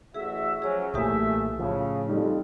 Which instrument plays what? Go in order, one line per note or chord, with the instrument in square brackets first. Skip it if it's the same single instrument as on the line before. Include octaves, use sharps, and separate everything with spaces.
[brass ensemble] A1 F#4 E5 [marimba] G#4
[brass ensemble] F3 F#3 C#4 [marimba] G#4 C#5
[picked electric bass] B1 A#2 E3 [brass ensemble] A3 E5 [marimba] G4 G#5 D#6
[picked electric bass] A2 F3 [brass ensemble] C#3
[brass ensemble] F2 [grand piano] G3 D#4